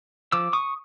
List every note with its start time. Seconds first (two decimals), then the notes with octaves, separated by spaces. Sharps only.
0.32 F3 D6 E6
0.53 C#6 D#6